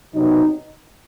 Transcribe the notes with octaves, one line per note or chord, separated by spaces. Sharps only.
C3 F#3 B3 D#4